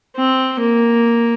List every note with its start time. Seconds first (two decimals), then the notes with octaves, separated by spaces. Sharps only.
0.16 C4
0.59 A#3